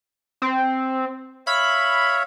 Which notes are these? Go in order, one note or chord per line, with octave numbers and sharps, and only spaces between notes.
C4
C#5 E5 F5 B5